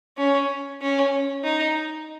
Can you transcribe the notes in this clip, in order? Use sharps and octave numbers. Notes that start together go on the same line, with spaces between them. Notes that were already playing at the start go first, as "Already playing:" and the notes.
C#4
C#4
D#4